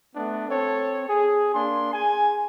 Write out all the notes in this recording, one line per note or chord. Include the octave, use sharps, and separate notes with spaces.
A3 B3 D4
C4 A4 C#5
G#4
A#3 D4 C6
G#4 G#5